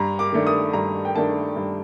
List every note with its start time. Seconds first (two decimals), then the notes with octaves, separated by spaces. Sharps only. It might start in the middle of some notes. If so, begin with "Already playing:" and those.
Already playing: G2 A#5
0.19 D6
0.32 D#3 A3 D4
0.47 D#6
0.73 G2 A#5
1.05 G5
1.15 D#3 A3 D4 A5
1.56 G2